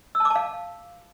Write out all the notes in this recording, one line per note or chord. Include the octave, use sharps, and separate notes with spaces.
E6
A5
D6
A5
F5